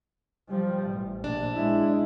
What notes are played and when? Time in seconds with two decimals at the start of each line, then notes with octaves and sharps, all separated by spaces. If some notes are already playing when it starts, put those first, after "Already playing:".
0.49 F3 G3
0.86 A1
1.24 A#1 D4
1.54 G#3 E4